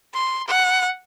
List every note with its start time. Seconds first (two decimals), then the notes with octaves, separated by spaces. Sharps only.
0.14 C6
0.48 F#5